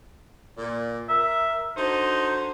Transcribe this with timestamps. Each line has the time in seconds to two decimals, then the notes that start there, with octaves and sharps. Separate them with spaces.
0.57 A#2
1.09 A#4 E5
1.77 D3 D#4 F#4 C5